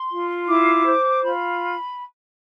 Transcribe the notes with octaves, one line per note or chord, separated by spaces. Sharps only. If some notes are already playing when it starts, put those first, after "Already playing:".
Already playing: C6
F4
E4 D6
C5
F4 B5